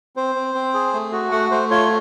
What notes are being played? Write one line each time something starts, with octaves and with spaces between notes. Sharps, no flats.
C4 C5
C4
C4
G#4
A3
F#4
A3 F#5
A3 C5
F4 C#5